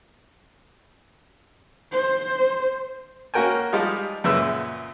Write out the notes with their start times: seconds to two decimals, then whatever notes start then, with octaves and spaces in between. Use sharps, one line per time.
1.93 C5
3.34 A#3 C#4 F#4 A#4 G5 G#5
3.73 F3 G3 G#3 D#4 F4 G4
4.24 F#2 A#2 C#3 B4 E5 E6